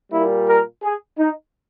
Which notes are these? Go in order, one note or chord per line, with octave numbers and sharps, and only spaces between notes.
A#2 G3 A#3 E4
A#4
G#4
D#4